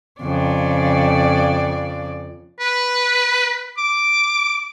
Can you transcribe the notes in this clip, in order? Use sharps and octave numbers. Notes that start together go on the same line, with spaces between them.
F2 C#3 D5
B4
D6